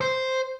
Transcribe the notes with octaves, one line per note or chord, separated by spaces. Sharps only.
C5